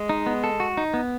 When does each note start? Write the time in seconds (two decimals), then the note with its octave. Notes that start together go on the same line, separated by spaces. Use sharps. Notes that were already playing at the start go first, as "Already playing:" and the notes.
Already playing: G#3
0.09 D#4
0.26 B3
0.44 A4
0.60 F#4
0.77 D#4
0.94 B3